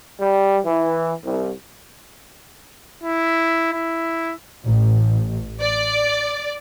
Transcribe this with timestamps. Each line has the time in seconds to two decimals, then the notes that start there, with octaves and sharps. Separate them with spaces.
0.19 G3
0.65 E3
1.24 C2
3.04 E4
3.73 E4
4.66 A1
5.62 D5